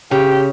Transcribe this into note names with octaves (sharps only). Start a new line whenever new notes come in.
C#3 G4